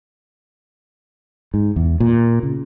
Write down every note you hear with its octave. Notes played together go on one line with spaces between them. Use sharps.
G#2
E2
A#2
C#3